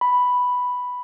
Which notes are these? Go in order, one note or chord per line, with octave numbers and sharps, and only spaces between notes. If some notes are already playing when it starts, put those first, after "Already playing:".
B5